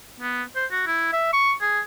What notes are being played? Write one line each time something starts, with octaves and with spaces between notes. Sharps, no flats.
B3
C5
F#4
E4
E5
C#6
G#4